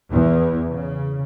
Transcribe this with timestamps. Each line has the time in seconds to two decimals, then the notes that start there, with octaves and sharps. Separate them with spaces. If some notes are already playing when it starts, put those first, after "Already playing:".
0.11 E2
0.68 C#3